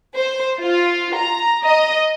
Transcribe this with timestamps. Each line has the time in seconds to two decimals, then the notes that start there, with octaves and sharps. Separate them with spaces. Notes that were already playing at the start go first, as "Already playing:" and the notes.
0.16 C5
0.62 F4
1.16 A#5
1.63 D#5